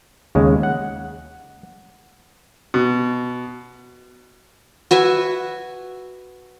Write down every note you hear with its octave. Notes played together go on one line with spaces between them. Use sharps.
D#2 C#3 G#3
F#5
B2
F#4 B4 E5 G#5